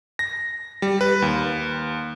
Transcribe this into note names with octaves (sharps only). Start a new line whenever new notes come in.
A#6
G3
B4
D#2